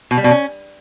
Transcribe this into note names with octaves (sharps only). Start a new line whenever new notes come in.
B2
G3
B2
C#4